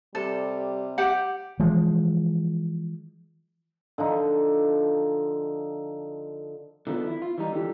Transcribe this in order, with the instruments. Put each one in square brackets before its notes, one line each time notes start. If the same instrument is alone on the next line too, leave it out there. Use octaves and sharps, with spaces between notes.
[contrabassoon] C3 [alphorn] G3 [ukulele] A4
[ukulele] G4 F#5
[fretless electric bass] E3 F3 G#3
[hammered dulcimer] D3 F3 D#4
[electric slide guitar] D3 D#3 F3 B3
E4
F4
E3 G3 D#4
D3 E3 F3 G4